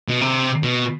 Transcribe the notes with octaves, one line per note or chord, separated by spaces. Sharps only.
B2
C3
B2